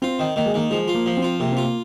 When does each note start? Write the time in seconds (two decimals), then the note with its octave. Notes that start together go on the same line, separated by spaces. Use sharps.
0.02 C4 F4
0.19 D#3
0.36 D#3 A#3
0.46 G#3
0.54 D#3 A#3
0.70 F3 G#3
0.88 F4
0.95 A#3
1.06 F3
1.17 C4
1.22 F4
1.40 C3 A#3
1.52 C4 F4
1.63 A#3